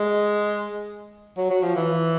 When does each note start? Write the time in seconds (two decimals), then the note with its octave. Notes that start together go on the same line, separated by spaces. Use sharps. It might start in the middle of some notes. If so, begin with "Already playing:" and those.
Already playing: G#3
1.38 F#3
1.50 F#3
1.63 F3
1.76 E3